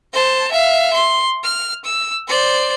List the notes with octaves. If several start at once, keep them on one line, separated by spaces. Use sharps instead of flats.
C5 A5
E5 F5
C6
F6
E6
C5 D5